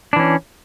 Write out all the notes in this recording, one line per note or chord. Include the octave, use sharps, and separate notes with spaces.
E3 C#4 D4